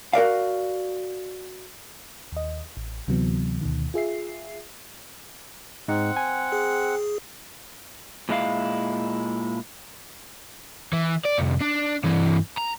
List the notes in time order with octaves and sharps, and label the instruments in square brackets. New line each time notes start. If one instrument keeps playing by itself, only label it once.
[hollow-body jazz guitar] F#4 A#4 D5 F5
[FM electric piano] D#2 D#5
A1
D2 C3 E3 F#3 B3
D2 B2 D#3
F4 G#4 E5 C7
[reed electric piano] G#2 D#4 [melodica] C4 F#5
[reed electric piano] G#5
[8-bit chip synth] G#4
[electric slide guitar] A#2 G#3 E4 F5
[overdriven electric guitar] E3
D5
C2 F2
D4
G2 E3
A#5